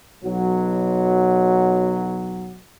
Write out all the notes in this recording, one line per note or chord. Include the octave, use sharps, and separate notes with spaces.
B1 F#3